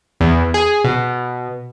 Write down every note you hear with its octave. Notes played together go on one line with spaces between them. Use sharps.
E2
G#4
B2